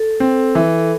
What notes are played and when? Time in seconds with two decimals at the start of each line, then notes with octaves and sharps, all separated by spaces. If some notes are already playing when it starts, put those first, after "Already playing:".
Already playing: A4
0.20 C4
0.55 E3